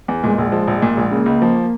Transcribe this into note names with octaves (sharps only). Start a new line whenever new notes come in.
E2
A#2 G#3
A#1
F3
A#1 G#3
A#2
A#1
C#3 A#3
C#2
F3